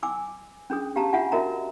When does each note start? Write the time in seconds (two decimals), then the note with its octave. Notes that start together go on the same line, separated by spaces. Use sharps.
0.03 G#5 D6 E6
0.70 C#4 D4 G#4 D#6
0.96 G4 F5 A5 A#5
1.13 D4 F4 E5 F#5 G#5
1.32 F#4 A#4 D#5 E5 A#5